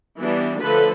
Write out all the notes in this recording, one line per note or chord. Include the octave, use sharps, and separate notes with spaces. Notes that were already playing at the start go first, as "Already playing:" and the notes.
E3 G3 B3 D4
D3 F3 A3 A4 B4